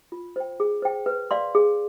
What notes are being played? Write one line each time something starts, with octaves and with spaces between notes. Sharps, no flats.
F4
C5 G5
G#4
C5 G5
B4
D5 F5 C6
G#4